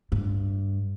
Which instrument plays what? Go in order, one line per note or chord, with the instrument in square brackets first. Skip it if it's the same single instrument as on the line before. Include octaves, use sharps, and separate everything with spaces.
[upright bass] G2